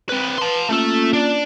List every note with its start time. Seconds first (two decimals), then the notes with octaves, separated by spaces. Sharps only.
0.09 C4 B4
0.38 B4 A5 C6
0.69 A3 A#3 C#4 F4 A4
1.13 D4